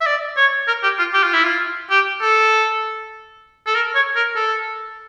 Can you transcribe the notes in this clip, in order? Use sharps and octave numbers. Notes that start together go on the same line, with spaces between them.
E5
D5
C#5
A#4
G4
F4
G4
F4
E4
F4
G4
A4
A4
A#4
C#5
A#4
A4